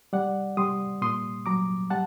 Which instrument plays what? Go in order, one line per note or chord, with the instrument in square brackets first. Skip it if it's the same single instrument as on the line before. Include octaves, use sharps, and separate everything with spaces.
[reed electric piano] G3 D5 F#5
G3 C6 D#6
A#2 C6 D#6
F#3 A#5 D6
G3 F#5 A5